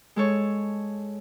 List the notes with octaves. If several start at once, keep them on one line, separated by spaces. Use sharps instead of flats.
G#3 A4 C#5